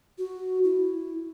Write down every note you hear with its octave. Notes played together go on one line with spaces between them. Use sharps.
F#4
E4